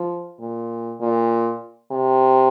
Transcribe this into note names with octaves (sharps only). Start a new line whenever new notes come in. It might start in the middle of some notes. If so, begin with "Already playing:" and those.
Already playing: F3
A#2
A#2
C3